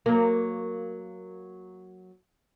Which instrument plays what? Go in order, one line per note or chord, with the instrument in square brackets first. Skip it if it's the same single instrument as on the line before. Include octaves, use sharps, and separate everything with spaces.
[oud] F#3 A#3